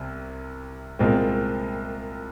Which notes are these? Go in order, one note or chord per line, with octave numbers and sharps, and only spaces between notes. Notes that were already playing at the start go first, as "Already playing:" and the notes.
Already playing: C2 C3
C2 A#2 G#3 C4